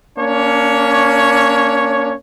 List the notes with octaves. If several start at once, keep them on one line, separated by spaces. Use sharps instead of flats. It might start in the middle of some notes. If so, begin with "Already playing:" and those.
A#3 C#4 D4 C#5